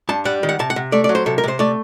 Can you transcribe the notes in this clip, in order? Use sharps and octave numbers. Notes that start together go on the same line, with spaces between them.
G2 A5
G3 F#5
D#3
F#5
C3 A5
F#5
C3
A3 D5
D5
F#3
C5
C3 A4
A#4
C3 C5
A3 D5